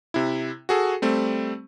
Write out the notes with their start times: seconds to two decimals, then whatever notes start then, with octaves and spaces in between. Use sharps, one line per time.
0.14 C3 E4
0.69 F#4 G#4 A4
1.02 G3 A3 C4